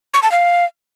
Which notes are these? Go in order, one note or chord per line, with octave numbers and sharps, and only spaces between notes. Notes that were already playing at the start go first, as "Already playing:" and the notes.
C#6
A5
F5